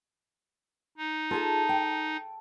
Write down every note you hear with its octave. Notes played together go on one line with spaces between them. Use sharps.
D#4
F4 G#4 A4 A5
G5